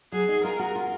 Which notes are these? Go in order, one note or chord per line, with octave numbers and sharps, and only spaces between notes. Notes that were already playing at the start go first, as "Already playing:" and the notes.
F#3 G#4
D#4
F4 A#4
F#4
F4